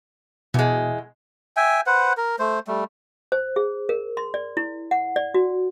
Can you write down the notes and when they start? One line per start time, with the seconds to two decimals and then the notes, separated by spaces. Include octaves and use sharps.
0.54 E2 B2 G#3
1.57 E5 G5 G#5
1.86 B4 C5 F#5
2.17 A#4
2.39 A3 C5
2.67 G3 A3
3.32 C5
3.56 G#4
3.89 A#4
4.17 C6
4.34 D5
4.57 E4
4.91 F#5
5.16 D5
5.34 F#4